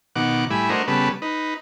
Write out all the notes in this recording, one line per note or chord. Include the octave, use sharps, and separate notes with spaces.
B2 D#3 F#5 D6
A2 G3 E4 G#5 B5
A3 D4 F#4 A#4 C5 D#5
C#3 G3 B3 A4 B4
D#4 B4